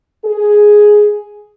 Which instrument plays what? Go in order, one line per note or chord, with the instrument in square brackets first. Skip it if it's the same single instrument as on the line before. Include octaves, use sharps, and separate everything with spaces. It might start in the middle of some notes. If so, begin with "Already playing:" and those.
[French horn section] G#4